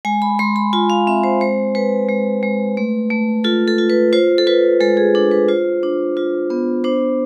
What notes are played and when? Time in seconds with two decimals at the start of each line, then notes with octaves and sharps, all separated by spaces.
0.05 G#3 G#5
0.22 B5
0.39 G#3 C6
0.56 B5
0.73 F4 G#5
0.90 F5
1.07 C4 E5
1.24 C5
1.41 G#3 C5
1.75 G#3 B4
2.09 G#3
2.43 G#3
2.77 A3
3.10 A3
3.44 F4 A4
3.68 A4
3.78 F4
3.90 B4
4.13 F4 C5
4.38 A4
4.47 F4 B4
4.80 G#3 A4
4.97 G#4
5.15 D4 A4
5.31 B4
5.49 F4 C5
5.83 D4
6.17 F4
6.50 B3
6.84 D4 C5